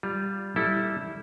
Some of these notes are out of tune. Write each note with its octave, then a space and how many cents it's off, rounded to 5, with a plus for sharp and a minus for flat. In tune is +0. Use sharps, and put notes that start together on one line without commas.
G3 +0 F4 +0
G3 +0 E4 -15 A4 +0